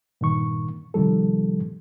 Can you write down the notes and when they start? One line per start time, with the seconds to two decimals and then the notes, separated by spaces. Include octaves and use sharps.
0.21 G2 A#2 D#3 C#6
0.94 C3 D#3 F3 G3 A4